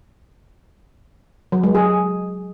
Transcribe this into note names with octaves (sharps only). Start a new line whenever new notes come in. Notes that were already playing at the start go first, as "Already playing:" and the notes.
F#3
G#3
G#4